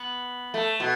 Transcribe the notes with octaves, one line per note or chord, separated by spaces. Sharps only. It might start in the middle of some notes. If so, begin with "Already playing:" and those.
Already playing: B3
A3
B2